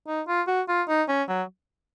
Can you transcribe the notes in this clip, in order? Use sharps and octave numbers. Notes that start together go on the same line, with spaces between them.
D#4
F4
F#4
F4
D#4
C#4
F#3